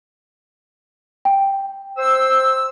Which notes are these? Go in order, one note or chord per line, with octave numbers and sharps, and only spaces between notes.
G5
C5 E6